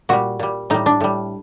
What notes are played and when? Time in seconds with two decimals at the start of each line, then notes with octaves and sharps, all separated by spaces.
0.09 A#2 G3 F#4
0.39 A#2 G3
0.70 A2 G3 D#4
0.86 D4
1.00 A2 G3